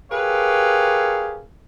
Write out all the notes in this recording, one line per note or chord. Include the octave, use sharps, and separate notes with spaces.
G4 G#4 A#4 B4 C#5 F5